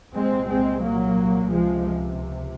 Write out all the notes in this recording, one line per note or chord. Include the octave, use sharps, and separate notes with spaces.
C2 A#2 G#3 C4
G#3 C4
F#3 A#3
C#2 C3 F3 G#3